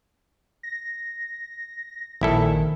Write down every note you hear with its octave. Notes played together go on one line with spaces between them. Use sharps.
A#6
A#1 D#3 E4 A4